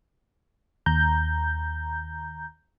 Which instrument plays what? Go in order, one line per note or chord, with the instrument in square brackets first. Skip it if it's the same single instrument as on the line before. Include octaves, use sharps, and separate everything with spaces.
[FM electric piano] D#2 A#5 G6